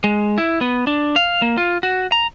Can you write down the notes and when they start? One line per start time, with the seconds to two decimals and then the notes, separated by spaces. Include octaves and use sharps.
0.04 G#3
0.38 E4
0.61 B3
0.87 D4
1.16 F5
1.42 A#3
1.57 F4
1.83 F#4
2.12 A#5